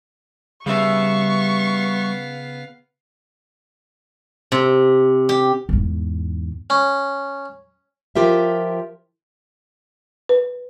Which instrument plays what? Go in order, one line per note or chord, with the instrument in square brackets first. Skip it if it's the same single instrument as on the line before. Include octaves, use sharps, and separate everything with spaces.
[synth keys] C#3 [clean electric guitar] G3 E5 [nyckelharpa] B3 F5 [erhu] C#6
[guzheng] C3
G4
[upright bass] E2 G#2
[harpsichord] C#4
[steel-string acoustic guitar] F3 F4 G4 A#4 E5
[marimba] B4